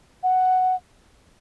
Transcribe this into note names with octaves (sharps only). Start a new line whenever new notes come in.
F#5